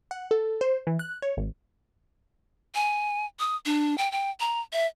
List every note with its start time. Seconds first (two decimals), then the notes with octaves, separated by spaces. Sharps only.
0.11 F#5
0.31 A4
0.61 C5
0.87 E3
0.99 F#6
1.22 C#5
1.37 G#1
2.75 G#5
3.39 D#6
3.66 D4
3.98 G5
4.12 G5
4.40 A#5
4.73 E5